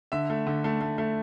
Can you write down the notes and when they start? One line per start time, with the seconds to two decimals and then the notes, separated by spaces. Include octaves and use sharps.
0.12 D3 E5
0.30 A3
0.47 D3
0.64 A3
0.81 A3
0.98 A3